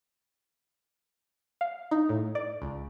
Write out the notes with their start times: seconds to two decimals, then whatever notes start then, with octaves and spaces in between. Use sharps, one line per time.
1.61 F5
1.91 D#4
2.09 A2
2.35 D5
2.62 C#2